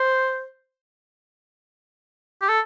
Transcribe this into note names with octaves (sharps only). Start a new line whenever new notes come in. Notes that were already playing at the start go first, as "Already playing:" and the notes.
Already playing: C5
G4
A4